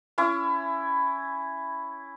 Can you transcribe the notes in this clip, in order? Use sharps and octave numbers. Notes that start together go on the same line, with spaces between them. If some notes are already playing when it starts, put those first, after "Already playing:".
C#4 E4